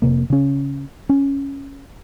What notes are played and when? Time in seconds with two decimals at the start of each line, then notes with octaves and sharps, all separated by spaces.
0.02 F1 C3 A#3
0.30 C#3 C#4
1.09 C#4